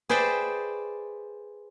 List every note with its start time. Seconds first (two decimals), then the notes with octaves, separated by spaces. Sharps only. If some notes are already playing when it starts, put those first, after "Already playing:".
0.09 G#4 B4 C5 D5 E5 G5